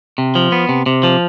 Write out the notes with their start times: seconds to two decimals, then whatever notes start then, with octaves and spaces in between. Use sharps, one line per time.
0.18 C3
0.35 F3
0.52 B3
0.69 C3
0.86 C3
1.03 F3